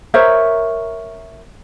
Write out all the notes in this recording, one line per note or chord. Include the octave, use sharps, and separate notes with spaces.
A#4 C5 C#5 E5